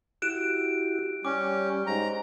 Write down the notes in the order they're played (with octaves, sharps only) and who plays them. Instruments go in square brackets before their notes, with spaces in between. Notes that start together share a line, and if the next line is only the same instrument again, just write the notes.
[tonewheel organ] E4 F#4 G4 [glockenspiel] F#6 D7 E7
[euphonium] G3 [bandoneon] C#4 [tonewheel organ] G5 [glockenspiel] D6
[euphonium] G#2 [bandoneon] A#5